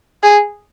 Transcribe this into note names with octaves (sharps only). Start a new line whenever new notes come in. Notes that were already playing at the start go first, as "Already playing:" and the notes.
G#4